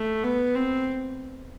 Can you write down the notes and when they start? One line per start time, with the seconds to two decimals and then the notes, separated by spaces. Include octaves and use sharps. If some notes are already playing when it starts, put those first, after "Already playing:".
Already playing: A3
0.23 B3
0.55 C4